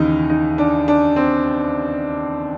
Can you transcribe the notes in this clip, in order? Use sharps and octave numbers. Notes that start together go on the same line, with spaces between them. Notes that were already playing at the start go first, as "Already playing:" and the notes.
Already playing: D#2 C#3 E3 D#4
D#4
D4
D4
C4